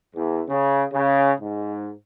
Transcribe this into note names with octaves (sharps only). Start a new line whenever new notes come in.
E2
C#3
C#3
G#2